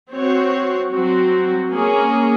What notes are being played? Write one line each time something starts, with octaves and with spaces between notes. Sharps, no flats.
C4 F#4 C#5
F#3 C4 F#4
A#3 C#4 G#4 C#5